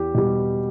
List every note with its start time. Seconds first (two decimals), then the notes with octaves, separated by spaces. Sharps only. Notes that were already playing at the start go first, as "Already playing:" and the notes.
Already playing: E2 G4
0.14 B2 G3